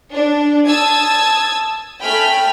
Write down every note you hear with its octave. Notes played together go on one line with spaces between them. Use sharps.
D4
A5 D#6 E6 G#6
A3 G5 G#5 B5 F6 B6